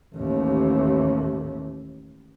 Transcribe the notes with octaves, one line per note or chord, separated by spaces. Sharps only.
A1 D#2